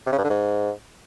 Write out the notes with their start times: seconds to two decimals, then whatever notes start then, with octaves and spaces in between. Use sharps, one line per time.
0.06 C3
0.12 C#3
0.18 G2
0.24 D3
0.30 G#2